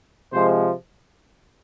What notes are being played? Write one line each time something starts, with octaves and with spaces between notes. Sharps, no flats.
C3 F3 G#3 C5